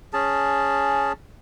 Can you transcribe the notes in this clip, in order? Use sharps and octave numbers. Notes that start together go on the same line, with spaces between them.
C#4 G#4 A5